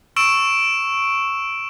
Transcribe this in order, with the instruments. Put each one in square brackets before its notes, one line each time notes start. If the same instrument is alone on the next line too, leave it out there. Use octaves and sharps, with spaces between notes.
[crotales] C#6 E6 D7 E7